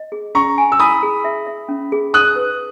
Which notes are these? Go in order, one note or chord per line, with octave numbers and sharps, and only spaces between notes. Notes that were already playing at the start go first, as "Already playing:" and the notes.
Already playing: D#5
G#4
C#4 A#5 C#6
G#5
E6
E4 B5 D#6
G#4
E5
E5
C#4
G#4
D#4 D#6 F#6
B4